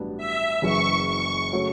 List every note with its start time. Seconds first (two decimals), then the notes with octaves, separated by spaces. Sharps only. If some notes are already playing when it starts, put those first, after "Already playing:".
Already playing: A1 G2 F#3 B3 D4
0.17 E5
0.62 F#1 F#2 C#3 E3 C#6
1.08 C#6
1.53 C#3 F#3 A3 C#4